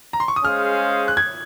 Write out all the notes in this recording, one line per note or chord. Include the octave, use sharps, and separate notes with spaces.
A#5
C6
C#6
D#6
G#3 C#4 G#4 C5 F5 F6
F#6
G#6